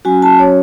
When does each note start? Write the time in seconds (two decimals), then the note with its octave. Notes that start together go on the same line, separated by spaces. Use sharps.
0.05 F#3 C#4 F#4 G#5
0.22 A5
0.39 C#5